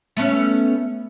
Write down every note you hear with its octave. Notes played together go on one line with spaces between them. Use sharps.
A3 B3 C#4